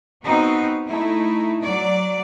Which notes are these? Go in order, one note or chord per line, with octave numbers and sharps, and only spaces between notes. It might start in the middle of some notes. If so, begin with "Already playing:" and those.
B3 C4 D#4 F#4
A3 D#4 E4
F#3 D5